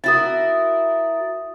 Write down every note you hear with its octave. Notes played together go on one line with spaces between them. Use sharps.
E4 F#4 A#4 D#6 A6